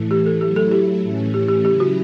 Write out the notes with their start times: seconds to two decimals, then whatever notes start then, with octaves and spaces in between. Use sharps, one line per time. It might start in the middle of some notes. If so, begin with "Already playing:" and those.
Already playing: A2 E3 A3
0.11 G4
0.26 A4
0.41 F#3 A3 E4 G4
0.56 A4
0.71 G4
1.03 A2 E3 A3 C#4
1.34 G4
1.48 G4
1.64 C#3 F#3 C#4 E4 G4
1.80 F#4